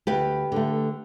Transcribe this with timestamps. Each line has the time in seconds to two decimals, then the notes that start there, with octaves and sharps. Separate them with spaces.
0.07 D2 G4 B4
0.52 D3 A3